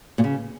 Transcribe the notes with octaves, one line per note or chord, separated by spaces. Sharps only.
A#2
C#3